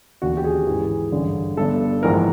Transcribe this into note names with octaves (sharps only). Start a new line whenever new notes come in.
E1 D#2 D3 F#4
G4
G#4
A1 G#2 E3
A1 G2 D3
G1 G2 D3 A4
A#1 G#2 E3 A#4